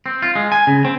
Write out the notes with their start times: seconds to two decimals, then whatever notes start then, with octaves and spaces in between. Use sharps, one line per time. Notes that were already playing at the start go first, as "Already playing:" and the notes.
0.06 C4
0.22 F4
0.35 G#3
0.52 G#5
0.67 C#3
0.85 C4